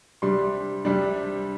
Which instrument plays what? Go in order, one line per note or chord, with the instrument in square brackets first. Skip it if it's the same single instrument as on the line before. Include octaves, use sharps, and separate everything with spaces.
[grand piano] C3 G3 D4 C6
C3 G3 D4